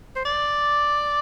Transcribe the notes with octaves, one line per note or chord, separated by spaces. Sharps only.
C5
D5